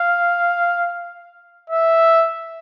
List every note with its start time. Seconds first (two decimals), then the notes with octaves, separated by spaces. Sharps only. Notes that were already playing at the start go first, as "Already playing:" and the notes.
Already playing: F5
1.70 E5